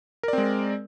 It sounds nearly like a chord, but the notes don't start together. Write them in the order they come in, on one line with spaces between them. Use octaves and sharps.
A#4 D5 C4 G#3